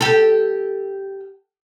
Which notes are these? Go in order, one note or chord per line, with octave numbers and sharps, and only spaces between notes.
G4 A4